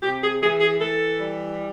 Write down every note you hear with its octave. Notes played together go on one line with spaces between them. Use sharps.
C3 G4
G#4
E3 G#4
G#4
E3 A4
G3